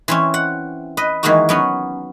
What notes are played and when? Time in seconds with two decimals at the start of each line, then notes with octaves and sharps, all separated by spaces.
0.08 E3 C4 C#4
0.34 F#5
0.97 B4 D#5
1.23 D#3 E3 G#3 A#3 D#4 F#4
1.49 F#3 B3 C#4